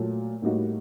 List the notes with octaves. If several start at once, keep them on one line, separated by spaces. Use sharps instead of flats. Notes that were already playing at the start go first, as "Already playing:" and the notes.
Already playing: A#2 F#3 A3
A2 G3 A#3 D#4 F#4